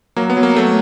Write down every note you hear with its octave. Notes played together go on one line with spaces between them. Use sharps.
F#3 A#3
B3
F#3
A#3
F#3 A3